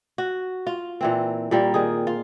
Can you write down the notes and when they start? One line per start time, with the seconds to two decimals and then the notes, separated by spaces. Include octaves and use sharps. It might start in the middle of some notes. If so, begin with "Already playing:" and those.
0.18 F#4
0.67 F4
1.01 A#2 E3 C4
1.51 A#2 G3 A#3
1.74 D#3 G#4
2.07 F4